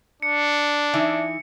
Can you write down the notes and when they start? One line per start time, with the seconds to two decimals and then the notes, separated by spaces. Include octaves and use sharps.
0.22 D4 C#7
0.93 E3 D#4 E4